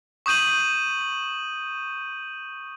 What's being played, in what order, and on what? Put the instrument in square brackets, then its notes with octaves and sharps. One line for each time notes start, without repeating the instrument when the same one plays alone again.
[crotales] C#6 D#6 G6 D#7 F#7